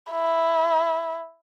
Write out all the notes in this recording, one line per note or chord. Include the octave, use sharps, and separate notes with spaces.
E4